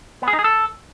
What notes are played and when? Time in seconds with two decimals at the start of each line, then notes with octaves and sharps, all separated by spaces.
0.22 B3
0.28 G#4
0.33 D#4
0.39 G#4
0.44 A4